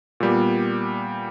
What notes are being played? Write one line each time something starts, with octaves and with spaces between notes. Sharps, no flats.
A#2 G3 B3